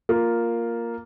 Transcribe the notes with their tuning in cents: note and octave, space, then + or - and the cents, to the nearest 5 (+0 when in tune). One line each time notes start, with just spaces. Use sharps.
A#3 +0 F4 +0